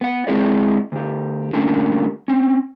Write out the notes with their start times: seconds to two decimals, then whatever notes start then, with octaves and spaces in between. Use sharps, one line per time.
0.01 B3 F#5
0.27 G#3 C4 E4 G#4 D5 D#5
0.92 D2 G4
1.53 D3 G3 A3 A#3 C#4 D4
2.28 C4 C#4